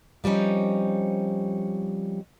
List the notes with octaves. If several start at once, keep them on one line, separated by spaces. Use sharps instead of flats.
F3 G3 C4 C#4 D#4